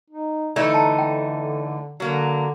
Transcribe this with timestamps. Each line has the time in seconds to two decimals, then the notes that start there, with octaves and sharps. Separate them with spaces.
0.10 D#4
0.56 D3 E3 A3 D#4 D5
0.74 A5 A#5
0.99 G5
2.00 D3 F#3 A#3